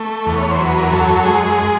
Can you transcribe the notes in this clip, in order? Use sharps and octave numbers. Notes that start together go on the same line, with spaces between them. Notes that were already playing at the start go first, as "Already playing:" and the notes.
Already playing: A3
E2
C#5
C5
F#3
B4
A#4
F#2 A4
A4
G#3 G#4